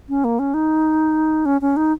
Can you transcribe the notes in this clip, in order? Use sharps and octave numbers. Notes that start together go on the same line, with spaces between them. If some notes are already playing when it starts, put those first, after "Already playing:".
C#4
A#3
C#4
D#4
C#4
C#4
D#4